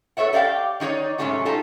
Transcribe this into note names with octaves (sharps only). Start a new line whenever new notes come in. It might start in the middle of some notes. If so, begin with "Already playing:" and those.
A4 B4 C#5 E5 F#5
G4 D5 F5 G5
D#3 D#4 F#4 C#5 D5
G#2 C3 F#3 A3 C#4 F#4
D#4 F4 G4 A4